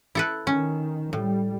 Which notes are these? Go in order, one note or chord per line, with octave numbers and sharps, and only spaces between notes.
E4 A4 B4
D#3 C#4
A2 G3